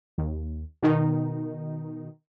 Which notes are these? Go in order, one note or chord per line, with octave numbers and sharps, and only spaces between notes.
D#2
B2 D#3 D#4